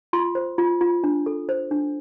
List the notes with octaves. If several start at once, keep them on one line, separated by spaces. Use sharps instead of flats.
F4 C6
C5
F4
F4
D4
A4
C5
D4